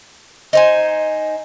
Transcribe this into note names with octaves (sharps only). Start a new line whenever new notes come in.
D#4 C5 G#5